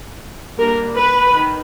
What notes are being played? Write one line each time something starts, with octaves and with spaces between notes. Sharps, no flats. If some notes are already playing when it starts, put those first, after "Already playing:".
G3 A#3 D4 A#4
B4
D#3